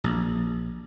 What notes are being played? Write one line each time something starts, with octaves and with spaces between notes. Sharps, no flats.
A#1